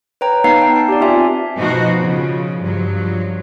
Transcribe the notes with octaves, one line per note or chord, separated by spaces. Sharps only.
B4 C#5 G5 A#5
B3 D#4 B4 F5 A#5 C7
G5 A5
A5
G4 D5
C4 F4 G4 E5 G#5
B2 F3 D#4 F#4 C5
C#3 F3
G2 F3 F#3